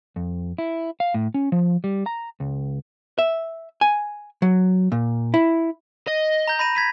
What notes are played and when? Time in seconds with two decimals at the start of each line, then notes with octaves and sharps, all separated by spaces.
0.16 F2
0.58 E4
1.00 F5
1.14 A2
1.34 C#4
1.52 F3
1.84 G3
2.06 A#5
2.40 C#2
3.19 E5
3.81 G#5
4.42 F#3
4.92 A#2
5.34 E4
6.08 D#5
6.48 A#5 G6
6.59 B5 A#6 D#7
6.75 G#6 B6 D#7